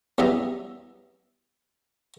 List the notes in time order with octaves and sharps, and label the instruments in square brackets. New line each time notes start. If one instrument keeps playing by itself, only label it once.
[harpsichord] E2 F#3 G3 B3 E5 A#5